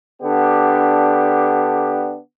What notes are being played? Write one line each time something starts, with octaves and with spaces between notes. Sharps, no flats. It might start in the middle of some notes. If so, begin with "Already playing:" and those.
D3 B3 D4 G4